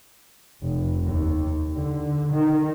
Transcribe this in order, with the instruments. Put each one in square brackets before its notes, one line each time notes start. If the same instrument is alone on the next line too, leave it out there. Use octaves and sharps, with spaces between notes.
[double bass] F1
D#2
D3
D#3